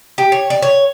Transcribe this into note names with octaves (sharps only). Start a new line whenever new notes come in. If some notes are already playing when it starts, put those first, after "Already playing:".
G4
C#5
D5
C#5